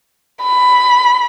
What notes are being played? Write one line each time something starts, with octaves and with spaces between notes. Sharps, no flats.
B5